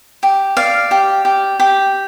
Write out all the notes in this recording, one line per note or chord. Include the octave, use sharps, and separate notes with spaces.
G4
D5 F5
G4
G4
G4